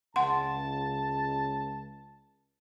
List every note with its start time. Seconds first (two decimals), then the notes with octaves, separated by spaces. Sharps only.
0.16 C#2 F#5 A5 C6